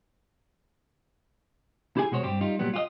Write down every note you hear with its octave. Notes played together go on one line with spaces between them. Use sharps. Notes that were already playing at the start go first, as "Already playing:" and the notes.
E4 G4 G#4 G#5
B2 G#3 F#4 C5 C#5
G2 G3 C4 G4
G3 D#4 F4
A#2 F#3 G3 B3
F4 G4 D#5